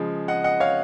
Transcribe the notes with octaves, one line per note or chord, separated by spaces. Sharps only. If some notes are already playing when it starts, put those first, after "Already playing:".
Already playing: C#3 F3 G#3
D#5 F#5
D#5 F#5
C#5 F5